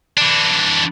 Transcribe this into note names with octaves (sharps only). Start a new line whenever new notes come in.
E3 D4